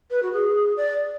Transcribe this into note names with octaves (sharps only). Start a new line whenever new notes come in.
B4
F#4
G#4
D5